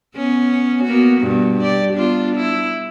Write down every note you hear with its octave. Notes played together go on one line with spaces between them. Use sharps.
B3 C#4
A#3 B3 F#4
G2 B2
G4 D5
B3 D4 F4
E4